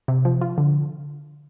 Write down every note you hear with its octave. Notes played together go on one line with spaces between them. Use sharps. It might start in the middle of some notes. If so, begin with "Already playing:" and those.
C3
F3
F4
D3